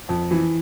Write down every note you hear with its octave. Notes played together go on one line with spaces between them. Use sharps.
F2
E3